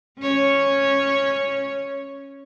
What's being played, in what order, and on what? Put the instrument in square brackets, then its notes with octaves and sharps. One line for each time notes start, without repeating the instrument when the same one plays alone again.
[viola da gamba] C#4 C#5